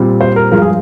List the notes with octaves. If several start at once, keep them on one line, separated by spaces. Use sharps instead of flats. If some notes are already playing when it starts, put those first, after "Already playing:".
Already playing: A#2 G3 C4
C5
A#4
G2 F3 G#3 A#4
G#4